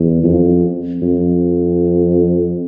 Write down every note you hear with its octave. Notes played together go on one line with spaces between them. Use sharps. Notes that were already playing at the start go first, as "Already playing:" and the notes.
Already playing: E2
F2
F2